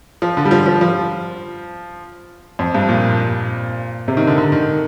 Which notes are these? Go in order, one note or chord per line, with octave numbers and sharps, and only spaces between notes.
F3
D3
G3
F3
F3
F3
F2
G2
A#2
C3
D#3
D3
D3
D#3